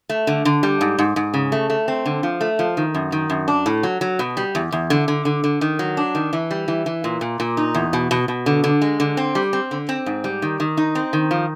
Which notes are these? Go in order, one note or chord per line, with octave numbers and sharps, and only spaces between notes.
A3
D3
D3
G3
G#2
G#2
G#2
C#3
A3
A3
C4
D3
F3
A3
F3
D#3
F#2
D#3
F#2
D4
A2
F#3
F#3
B2
G3
E2
E2
D3
D3
D3
D3
D#3
F#3
D4
D#3
E3
G3
E3
E3
A#2
A#2
A#2
D#4
E2
B2
B2
B2
D3
D3
G#3
D3
C4
G3
C4
D3
C4
G#2
G3
D#3
D#3
D#4
C4
D#3
F3